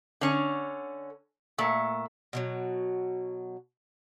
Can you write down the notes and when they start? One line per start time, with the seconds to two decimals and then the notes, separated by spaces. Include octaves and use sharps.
0.21 D3 C#4
1.58 A#2 A3
2.33 B2 D#3 F#3